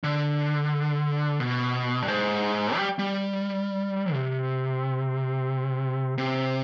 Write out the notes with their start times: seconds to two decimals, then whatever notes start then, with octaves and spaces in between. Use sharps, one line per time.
0.04 D3
1.40 B2
2.02 G2
2.08 G#2
2.76 G3
2.99 G3
4.13 C3
6.18 C3